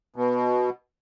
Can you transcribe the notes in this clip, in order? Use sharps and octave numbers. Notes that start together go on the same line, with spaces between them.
B2